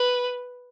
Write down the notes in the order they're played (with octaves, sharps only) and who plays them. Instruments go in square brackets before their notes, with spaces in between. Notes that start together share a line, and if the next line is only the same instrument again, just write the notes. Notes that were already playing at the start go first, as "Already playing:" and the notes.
Already playing: [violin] B4